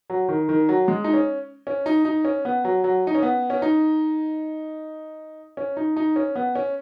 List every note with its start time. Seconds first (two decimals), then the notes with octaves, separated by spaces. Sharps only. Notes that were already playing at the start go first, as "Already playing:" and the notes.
0.10 F#3
0.29 D#3
0.49 D#3
0.69 F#3
0.88 G#3
1.04 D#4
1.14 C#4
1.67 C#4
1.86 D#4
2.05 D#4
2.25 C#4
2.45 B3
2.65 F#3
2.84 F#3
3.07 D#4
3.15 C#4
3.22 B3
3.50 C#4
3.62 D#4
5.57 C#4
5.77 D#4
5.97 D#4
6.16 C#4
6.35 B3
6.55 C#4